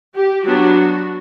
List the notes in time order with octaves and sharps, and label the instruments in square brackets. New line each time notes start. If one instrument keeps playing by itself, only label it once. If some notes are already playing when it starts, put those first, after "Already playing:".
[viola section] G4
F#3 B3 D4 F#4